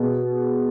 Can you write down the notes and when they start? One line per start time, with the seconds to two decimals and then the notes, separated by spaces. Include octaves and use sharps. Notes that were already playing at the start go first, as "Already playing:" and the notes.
Already playing: B2 B3 G#4